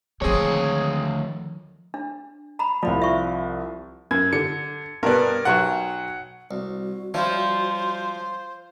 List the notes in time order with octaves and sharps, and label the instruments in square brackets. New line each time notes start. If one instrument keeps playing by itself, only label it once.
[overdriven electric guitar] D2 C#5 [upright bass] D#3 F3 [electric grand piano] G#3 C4 G#4
[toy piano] D4
A#5 B5
[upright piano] C2 F3 [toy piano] D5 B5
[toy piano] E5 C#6
[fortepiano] F#2 [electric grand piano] G#6
[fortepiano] D3 [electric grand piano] C#7
[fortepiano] G2 B2 B3 [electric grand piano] A#4 D5
[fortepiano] B1 F#3 C#6 [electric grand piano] F#5
[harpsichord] C2 [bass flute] F#4
[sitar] F3 [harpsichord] G3 C#4 E4 [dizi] C5